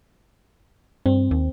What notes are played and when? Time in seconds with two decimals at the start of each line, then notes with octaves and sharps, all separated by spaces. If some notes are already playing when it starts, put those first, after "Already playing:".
1.06 G2 C4
1.31 D#2